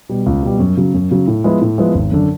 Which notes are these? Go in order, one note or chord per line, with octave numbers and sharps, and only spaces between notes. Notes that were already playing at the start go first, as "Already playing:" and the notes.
B2 G3
C#2
B2 G3
F#2
C#3 F#3
F#2
C#3 F#3
A2
F3 G#3 B3 E4
A2
F3 G#3 B3 E4
G#1
F#2 D3